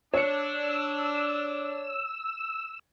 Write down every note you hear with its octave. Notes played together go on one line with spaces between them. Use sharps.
D4 C#5 E6 C#7